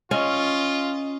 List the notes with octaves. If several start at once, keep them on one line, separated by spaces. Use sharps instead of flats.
C#4 F4 D#5